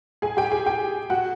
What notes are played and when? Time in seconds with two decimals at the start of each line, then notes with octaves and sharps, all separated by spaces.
0.22 G#4 G#5
0.37 G4 G5
0.51 G#4 G#5
0.66 G4 G5
1.10 F#4 F#5